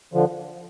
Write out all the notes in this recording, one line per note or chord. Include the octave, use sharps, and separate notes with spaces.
D3 F3